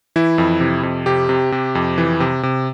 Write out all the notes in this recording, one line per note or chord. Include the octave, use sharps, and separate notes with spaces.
E3 E4
F2
C3
F2
C3 G4
C3
C3
F2
E3
C3
C3